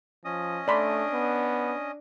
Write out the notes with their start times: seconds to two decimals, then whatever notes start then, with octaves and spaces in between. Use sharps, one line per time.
0.25 F3 C#4 D#5 D#6
0.68 A3 D4 D5 B5 C6
1.13 B3